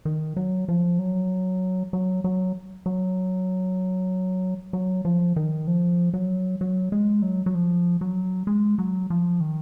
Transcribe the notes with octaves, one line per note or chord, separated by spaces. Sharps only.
D#3
F#3
F3
F#3
F#3
F#3
F#3
F#3
F3
D#3
F3
F#3
F#3
G#3
F#3
F#3
F3
F#3
G#3
F#3
F3
D#3